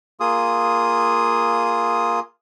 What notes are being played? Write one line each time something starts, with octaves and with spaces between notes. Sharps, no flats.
A#3 F4 G#4 D#6